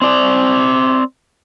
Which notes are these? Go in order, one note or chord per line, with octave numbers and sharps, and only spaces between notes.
C4 D5